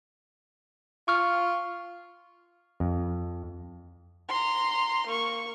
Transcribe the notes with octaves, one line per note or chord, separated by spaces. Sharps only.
F4 C#6 F6
F2
A#5 C6
A#3 C#6